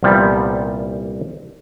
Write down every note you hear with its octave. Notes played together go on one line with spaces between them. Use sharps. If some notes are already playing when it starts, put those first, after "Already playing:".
C2 A#2 F3 G3 B3